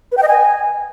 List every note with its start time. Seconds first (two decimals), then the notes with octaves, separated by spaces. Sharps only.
0.12 B4
0.17 G5
0.23 D#5
0.28 G#5